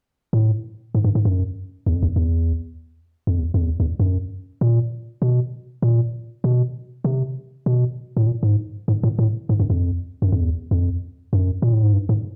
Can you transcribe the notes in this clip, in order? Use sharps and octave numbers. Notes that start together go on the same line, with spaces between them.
A2
G#2
G2
G#2
F#2
E2
F2
E2
E2
F2
E2
F2
E2
E2
F#2
A#2
B2
A#2
B2
C3
B2
A2
A#2
G#2
G#2
A2
A2
G#2
F#2
F2
F#2
F2
E2
F2
F#2
A#2
A2
G#2
G2
G#2